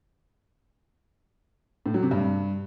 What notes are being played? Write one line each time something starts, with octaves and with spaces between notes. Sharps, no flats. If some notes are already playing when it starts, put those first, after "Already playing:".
A2
F#3
C3
G2